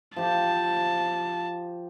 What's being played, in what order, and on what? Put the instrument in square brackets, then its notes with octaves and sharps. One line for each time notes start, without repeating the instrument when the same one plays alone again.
[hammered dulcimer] F3 G4 [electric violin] A5